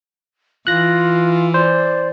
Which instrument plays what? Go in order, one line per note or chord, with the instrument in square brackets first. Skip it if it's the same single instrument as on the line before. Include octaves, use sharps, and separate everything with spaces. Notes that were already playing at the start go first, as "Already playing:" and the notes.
[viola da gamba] E3 [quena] F4 [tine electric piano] F#6 A#6
[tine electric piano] C5 [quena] D5